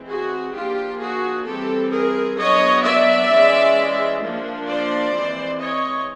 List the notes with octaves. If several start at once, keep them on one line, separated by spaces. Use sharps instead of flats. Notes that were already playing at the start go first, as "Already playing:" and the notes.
Already playing: E3 G#3 C4
F#4 G#4
F3 A#3 D4 F4 G4
F#4 G#4
E3 G3 C4 G4 A4
G#4 A#4
F#3 B3 D4 C#5 D#5
D5 E5
E3 G#3 C#4
F3 A#3 D4
C5 D5
E3 G#3 C4
C#5 D#5